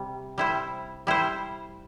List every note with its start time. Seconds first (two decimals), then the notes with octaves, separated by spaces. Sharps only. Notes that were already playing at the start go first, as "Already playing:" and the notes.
Already playing: C3 G3
0.38 G3 E4 C5
1.07 G3 E4 C5